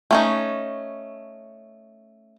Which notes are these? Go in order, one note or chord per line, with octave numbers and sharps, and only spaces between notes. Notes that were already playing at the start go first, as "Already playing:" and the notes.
A3 C#4 D#4